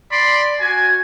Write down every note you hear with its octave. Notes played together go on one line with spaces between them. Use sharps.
D5 B5 C6
F#4 G#5